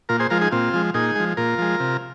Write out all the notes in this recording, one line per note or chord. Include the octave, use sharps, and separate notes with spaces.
A#2 F4 A#4
G#4 C5
F3 G#3 F4 A#4
D#4 G#4
A#2 C4 F4
F3 G#3
A#2 D#4 G#4
F3 G#3
A#2 F4 A#4
F3 G#3
C3